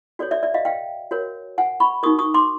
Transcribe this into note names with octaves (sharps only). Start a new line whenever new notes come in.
F#4 A4 C#5 D5
D5 E5
D5 E5
D#5 F5
F5 G5
F#4 A#4 C#5
F#5 G#5
B5 C#6
D#4 F#4 A#4 C#6 D#6
C#6 D#6
C6 D6